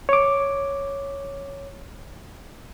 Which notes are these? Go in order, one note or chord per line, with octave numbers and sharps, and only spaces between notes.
C#5 D6